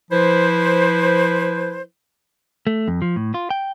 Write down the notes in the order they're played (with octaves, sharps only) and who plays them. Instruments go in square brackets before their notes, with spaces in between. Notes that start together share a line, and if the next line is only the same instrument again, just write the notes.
[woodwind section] F3 E4 B4 C5
[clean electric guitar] A3
F2
F3
A2
F4
G5